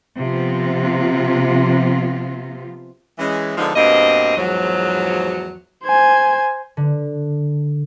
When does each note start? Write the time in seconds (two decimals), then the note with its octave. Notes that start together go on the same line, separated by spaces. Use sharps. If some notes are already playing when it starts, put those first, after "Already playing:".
0.18 C3 F3 B3 F4
3.19 E3 G#3 C#4
3.57 D3 F3 G#3 B3 D4 D#4
3.75 G2 B2 A#3 C4 D#5
4.37 E2 G#2 F3 F#3
5.84 C5 G#5
6.77 D3